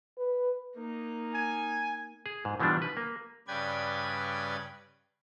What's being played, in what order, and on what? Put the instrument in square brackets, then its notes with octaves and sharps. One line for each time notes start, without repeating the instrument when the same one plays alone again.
[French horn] B4
[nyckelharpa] A#3 D#4
[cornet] G#5
[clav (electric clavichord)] G#4
G#2
B2 E3 F3 G3 D4
B4
A#3
[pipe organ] G2 C#3 B4 D5 G5 G#6